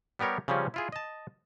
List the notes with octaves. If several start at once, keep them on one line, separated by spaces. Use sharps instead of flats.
G3 B3 G4 A#4 C#5
C#3 F3 G3 C4 C#4
E4 F4 G#4
D#5 A5